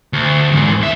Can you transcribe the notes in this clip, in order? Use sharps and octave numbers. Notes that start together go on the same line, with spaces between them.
D2
E2 G#2
D#2 E5